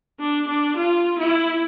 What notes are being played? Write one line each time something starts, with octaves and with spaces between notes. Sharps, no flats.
D4
D4
F4
E4